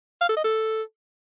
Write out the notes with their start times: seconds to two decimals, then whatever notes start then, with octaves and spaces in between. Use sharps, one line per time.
0.21 F5
0.29 A4
0.37 D#5
0.44 A4